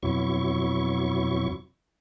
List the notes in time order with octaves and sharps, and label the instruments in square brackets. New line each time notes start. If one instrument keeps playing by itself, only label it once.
[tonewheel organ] F2 B2 F#3 E4 C#6